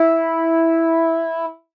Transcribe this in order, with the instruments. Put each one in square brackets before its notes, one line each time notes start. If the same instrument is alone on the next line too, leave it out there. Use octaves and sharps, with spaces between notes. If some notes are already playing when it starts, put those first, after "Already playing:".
Already playing: [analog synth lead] E4